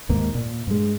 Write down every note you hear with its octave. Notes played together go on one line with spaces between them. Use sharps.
D#2 G#2 A#3
A#2
G2 G#3